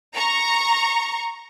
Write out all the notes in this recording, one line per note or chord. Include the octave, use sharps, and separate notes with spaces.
A#5 C#6